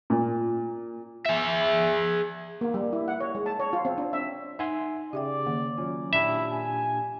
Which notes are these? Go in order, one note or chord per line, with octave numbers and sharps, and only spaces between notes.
A#2
G#4 E5
A#3
G3
E4
F#5
C#5
G#3
A5
C#5
F4
C4
D4
E5
D#4 E5 F#5 G#5 C6
C#3 G4 D5 E5 G5
D#3 A#3
F#3 C#4 F4
A#2 D4 E4 G4 D5 E5 B5
G#5